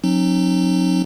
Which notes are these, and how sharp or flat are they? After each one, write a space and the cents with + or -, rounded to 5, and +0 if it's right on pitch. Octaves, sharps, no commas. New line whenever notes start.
F#3 -30 C4 +40 D#4 -20